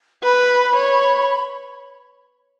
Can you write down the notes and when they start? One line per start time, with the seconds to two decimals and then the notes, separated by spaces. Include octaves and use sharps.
0.23 B4 B5
0.76 C#5
1.29 B5